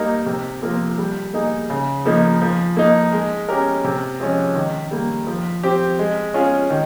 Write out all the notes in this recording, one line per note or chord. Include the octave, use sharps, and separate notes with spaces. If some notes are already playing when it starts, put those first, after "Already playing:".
Already playing: G3 A#3 D#4 A#4
C3
F3 A#3 F4 A#4
G3
A#3 D#4 G#4
C#3
F3 A#3 D#4
F3
A#3 D#4
G#3
C#4 G4 A#4
C3
F3 G#3 C#4
D#3
G3 A#3
F3
C4 G4
G#3
C#4 F4 G#4
D#3